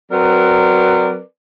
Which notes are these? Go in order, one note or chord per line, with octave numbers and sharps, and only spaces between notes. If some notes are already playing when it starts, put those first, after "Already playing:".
F#3 C4 A#4 B4 D5